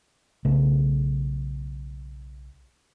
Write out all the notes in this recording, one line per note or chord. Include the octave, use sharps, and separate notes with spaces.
B1 C#3 A3